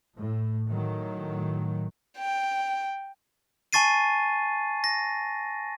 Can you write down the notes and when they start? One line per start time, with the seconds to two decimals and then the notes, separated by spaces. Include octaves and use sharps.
0.18 A2
0.69 A2 D#3 F#3
2.18 G5
3.73 G#5 A5 C#6 A6 C7 D#7
4.84 A#6